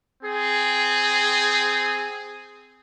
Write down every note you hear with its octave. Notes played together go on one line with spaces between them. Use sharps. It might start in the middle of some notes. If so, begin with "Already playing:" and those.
C4 G#4